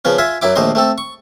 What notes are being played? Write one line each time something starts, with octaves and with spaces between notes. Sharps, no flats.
C#3 F3 B3 C#4
F4 E5 G#5 C6
F#2 F#3 E4 D6
A#1 D#2 A3 C5 D#5 C6
A3 C4 A4
C#6